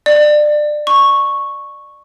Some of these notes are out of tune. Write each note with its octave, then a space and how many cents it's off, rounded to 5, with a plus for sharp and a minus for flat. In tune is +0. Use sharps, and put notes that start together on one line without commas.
D5 +25
C#6 -5